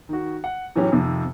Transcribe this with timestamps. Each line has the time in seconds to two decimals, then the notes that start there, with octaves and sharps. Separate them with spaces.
0.09 D#3 F#4
0.44 F#5
0.75 A2 E3 F#3 C#4 G4
0.92 F2 C3 D#3